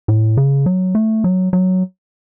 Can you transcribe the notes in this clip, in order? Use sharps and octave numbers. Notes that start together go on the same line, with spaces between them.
A2
C#3
F#3
A3
F#3
F#3